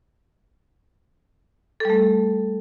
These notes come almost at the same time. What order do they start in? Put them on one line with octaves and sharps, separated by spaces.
A4 G3 A3